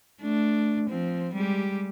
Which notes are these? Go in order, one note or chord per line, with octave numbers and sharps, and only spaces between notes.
A3 D4
F3 C4
G3 G#3 G4